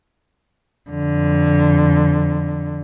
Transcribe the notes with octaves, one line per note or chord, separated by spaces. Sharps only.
F2 D3